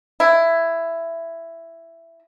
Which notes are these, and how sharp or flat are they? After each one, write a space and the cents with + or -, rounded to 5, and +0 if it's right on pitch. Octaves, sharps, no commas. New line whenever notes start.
E4 +10